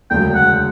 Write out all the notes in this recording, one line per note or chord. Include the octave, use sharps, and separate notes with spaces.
E1 D2 C#3 F#3 G5
F#5